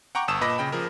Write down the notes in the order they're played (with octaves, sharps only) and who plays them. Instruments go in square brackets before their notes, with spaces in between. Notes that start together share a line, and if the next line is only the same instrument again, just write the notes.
[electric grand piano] F#5 G5 A#5 C#6 D6
G1 A5 D#6 E6 E7
A#2 B4 D#5 B5 D6 A#6
C#3 G5 B5
F3 G#4 A#4